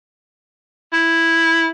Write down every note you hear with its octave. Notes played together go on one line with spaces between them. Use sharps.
E4